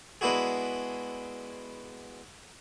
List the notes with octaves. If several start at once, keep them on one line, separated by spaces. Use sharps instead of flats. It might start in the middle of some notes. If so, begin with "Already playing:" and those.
G#3 B3 D4 E4 F#4 G#4